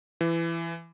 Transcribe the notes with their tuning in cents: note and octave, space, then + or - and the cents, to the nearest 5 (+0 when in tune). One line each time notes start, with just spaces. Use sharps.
E3 +20